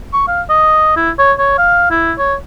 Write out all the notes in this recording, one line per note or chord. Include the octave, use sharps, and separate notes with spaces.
C#6
F5
D#5
E4
C#5
C#5
F5
E4
C#5